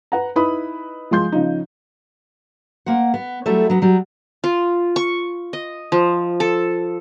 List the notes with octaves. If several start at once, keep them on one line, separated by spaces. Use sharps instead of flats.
B4 F#5 A#5
D#4 E4 B4 B5 D#6
F3 G#3 C6 G6
C#3 F3 D#4
A#3 C5 F#5
B3
F#3 G3 A3 E4 A4 E5
F#3 B3
F#3 G3
F4
C#6
D#5
F3
A4